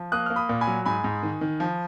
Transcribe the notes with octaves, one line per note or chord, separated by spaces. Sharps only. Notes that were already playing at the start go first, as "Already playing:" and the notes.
Already playing: F3
A#3 D#6 F#6
A#3 F6
B5 D#6
A#2
G#5 B5
F#3
G#2 G#5 B5
G#2
D#3
D#3
F3